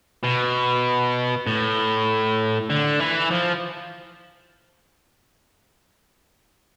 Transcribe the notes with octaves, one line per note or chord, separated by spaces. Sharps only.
B2
A2
D3
E3
F3